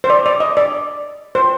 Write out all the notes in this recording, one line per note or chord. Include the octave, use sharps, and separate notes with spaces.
C5
D5
D5
D#5
D5
C5